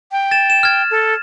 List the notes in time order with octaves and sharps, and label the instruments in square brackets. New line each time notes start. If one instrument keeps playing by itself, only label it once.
[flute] G5
[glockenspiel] A6 E7
E7
F6 G#6
[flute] A4